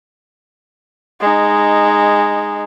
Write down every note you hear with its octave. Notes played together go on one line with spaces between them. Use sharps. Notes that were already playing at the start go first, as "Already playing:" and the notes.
G#3 D#4